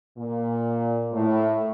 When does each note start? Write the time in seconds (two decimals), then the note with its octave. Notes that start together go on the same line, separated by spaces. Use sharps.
0.18 A#2
1.12 A2